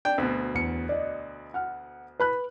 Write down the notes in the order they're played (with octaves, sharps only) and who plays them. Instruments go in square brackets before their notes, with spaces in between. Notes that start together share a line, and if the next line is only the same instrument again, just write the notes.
[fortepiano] D4 G5
D2 B2
[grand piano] E2 C#7
D5 D#5
F#5 F6
B4 B5 F#6